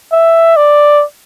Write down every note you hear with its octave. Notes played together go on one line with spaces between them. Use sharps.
E5
D5